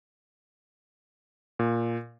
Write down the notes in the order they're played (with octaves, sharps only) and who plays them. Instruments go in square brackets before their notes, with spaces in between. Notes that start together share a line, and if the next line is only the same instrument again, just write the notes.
[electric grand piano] A#2